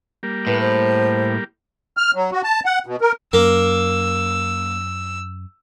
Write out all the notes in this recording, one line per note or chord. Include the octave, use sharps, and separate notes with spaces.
G3 A#3
A2 B4
C5
F6
F#3
F#4
A5
F#5
B2
A#4
F#2 A#3 E6